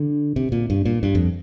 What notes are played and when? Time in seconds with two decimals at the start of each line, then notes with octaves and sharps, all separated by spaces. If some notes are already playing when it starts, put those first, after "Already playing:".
Already playing: D3
0.36 C3
0.52 A#2
0.70 G2
0.86 A#2
1.03 G2
1.15 F2